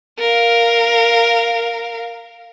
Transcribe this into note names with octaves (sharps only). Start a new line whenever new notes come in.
A#4 F5